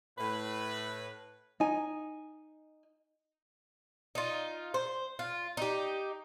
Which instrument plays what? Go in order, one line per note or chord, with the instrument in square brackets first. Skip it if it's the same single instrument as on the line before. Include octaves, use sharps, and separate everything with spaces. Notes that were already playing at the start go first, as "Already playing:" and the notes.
[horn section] A2 B4
[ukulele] D#4 G#5
[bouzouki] D#4 F4
C5
F4
D#4 G4